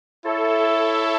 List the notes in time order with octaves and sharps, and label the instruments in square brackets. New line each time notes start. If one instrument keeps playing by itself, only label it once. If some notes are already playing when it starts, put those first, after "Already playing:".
[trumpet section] E4 C#5 E5 [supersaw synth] A4